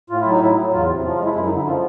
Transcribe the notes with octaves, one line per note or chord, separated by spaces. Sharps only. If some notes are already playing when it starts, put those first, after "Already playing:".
A2 F4
E4
F#3 D#4
A2 E4
F#3
E2 F4
C3
F3 F4
F4
G#3 E4
F#2 E4
D#4
D3
E4
F3 F4